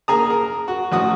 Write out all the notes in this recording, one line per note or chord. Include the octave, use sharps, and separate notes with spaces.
A#3 G#4 A#5 D#6
A#4
F#4
A1 F#4 D#6